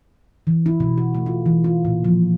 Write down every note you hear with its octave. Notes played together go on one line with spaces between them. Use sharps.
E3
E4
B2
F#4
A3
F4
E3
F4
A#2
F3